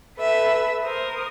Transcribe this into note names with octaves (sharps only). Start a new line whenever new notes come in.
A4 B4 E5
A#4 C5 D#6